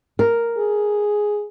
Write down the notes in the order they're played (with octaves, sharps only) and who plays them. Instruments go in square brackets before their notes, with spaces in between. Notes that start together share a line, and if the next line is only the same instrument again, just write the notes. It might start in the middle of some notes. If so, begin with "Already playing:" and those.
[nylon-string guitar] A#4
[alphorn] G#4